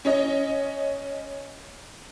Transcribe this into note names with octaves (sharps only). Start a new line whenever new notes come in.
C#4 C#5 D#5